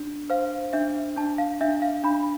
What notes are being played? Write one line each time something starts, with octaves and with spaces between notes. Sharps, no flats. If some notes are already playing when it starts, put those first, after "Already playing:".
Already playing: D4
C5 F5
D4 E5
D4 A5
F5
D4 E5
F5
D4 B5